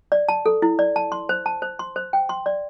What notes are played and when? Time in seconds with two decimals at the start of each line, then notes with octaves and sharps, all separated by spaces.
0.12 D5
0.29 A5
0.46 A4
0.62 E4
0.79 D5
0.96 A5
1.12 C6
1.29 C5
1.46 A5
1.62 C5
1.79 C6
1.96 C5
2.13 G5
2.29 C6
2.46 D5